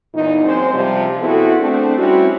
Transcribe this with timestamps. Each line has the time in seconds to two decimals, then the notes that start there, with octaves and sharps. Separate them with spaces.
0.13 E2 A#2 D#4
0.43 F#2 G#3 C4 C5
0.73 C3 F3 G3
1.18 B3 C4 E4 F#4 G#4 A4
1.59 A3 C4 D4
1.97 G3 C4 C#4 E4 F#4